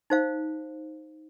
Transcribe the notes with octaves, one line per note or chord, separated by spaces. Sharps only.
D#4 C5 F5